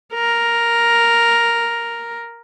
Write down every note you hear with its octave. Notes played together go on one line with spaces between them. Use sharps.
A#4